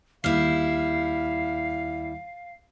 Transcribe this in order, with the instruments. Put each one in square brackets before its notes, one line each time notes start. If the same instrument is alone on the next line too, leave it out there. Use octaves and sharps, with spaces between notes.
[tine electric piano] D#2 F6 C7 [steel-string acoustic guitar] G3 E4 [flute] F5